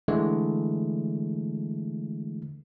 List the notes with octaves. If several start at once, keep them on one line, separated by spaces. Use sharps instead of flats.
D3 E3 G#3 A3